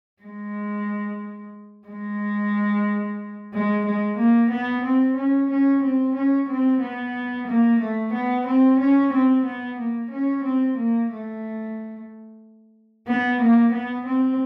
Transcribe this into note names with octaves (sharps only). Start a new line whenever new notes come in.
G#3
G#3
G#3
G#3
A#3
B3
C4
C#4
C#4
C4
C#4
C4
B3
A#3
A3
B3
C4
C#4
C4
B3
A#3
C#4
C4
A#3
A3
B3
A#3
B3
C4